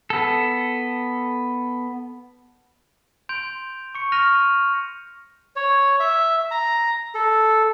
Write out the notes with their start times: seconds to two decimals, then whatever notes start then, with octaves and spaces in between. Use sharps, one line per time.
0.10 B3 A4
3.29 C6 G6 D7 F7
3.95 C#6 C#7
4.12 C#6 F6 A#6 D#7 F7
5.56 C#5
6.00 E5
6.51 A#5
7.15 A4